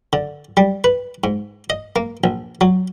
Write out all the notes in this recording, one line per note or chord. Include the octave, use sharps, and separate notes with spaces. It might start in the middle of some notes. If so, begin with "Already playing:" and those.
D3
G3
B4
G#2
D#5
A#3
A#1
F#3